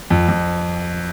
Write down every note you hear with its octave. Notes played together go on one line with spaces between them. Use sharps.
F2
F2